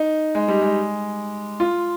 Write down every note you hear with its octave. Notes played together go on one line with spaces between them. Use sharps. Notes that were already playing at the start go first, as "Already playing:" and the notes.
Already playing: D#4
G#3
G3
G#3
F4